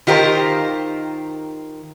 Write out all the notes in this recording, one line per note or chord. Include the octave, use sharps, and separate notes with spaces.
D#3 F4 G4 A#4 C5